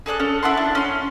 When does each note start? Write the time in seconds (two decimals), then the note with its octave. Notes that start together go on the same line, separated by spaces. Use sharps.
0.06 G#4 A4 D5 F#6
0.20 C#4 A4
0.43 E4 F#5 A5 C6
0.57 D4
0.75 C#4 C6